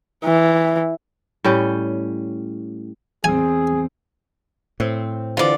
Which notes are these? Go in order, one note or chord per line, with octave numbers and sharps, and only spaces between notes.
E3
A2 G3 C#4 G5
E2 C4 G#4 G#5
A2 C4
D3 E3 F4 C5 D5